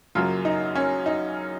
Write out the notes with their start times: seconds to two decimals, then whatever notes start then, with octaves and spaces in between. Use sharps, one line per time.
0.15 F#2 C#3 F#3 A#3 F4
0.45 D#4
0.75 C#4
1.06 D#4